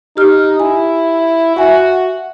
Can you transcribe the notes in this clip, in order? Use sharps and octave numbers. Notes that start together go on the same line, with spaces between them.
D#4 G4 F6
E4 G#5
F#4 E5 G#5